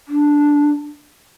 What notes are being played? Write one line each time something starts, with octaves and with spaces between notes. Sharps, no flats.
D4